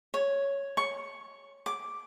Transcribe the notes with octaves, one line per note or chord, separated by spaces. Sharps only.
C#5
C#6
D6